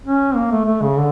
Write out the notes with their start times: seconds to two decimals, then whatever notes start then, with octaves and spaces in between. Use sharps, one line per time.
0.06 C#4
0.35 A#3
0.51 A3
0.66 A3
0.82 C#3
0.97 D3